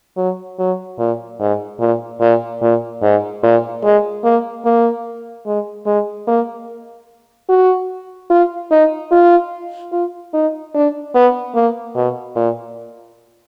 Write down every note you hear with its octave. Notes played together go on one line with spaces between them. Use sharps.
F#3
F#3
A#2
G#2
A#2
A#2
A#2
G#2
A#2
G#3
A#3
A#3
G#3
G#3
A#3
F#4
F4
D#4
F4
F4
D#4
D4
B3
A#3
B2
A#2